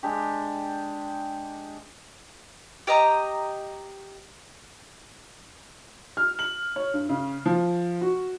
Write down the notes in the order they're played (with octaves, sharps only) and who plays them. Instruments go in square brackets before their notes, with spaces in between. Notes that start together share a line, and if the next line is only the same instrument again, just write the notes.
[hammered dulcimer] G#3 D4 G4
[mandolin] G4 D#5 A#5
[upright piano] F6
F#7
C#5
G2
C#3
F3
F#4